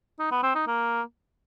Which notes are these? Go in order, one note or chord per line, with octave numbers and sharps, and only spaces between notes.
D#4
B3
C4
D#4
A#3